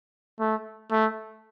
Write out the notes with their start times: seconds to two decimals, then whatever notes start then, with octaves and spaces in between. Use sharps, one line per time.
0.40 A3
0.91 A3